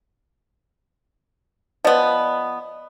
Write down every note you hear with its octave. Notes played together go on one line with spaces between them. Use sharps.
F3 B3 D5 D#5